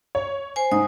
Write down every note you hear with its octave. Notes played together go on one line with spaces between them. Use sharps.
C#5
C5 G#5
G#2 D#6